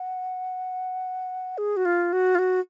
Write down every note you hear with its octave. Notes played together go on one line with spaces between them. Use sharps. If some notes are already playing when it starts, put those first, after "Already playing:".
Already playing: F#5
G#4
F#4
F4
F#4
F4
F#4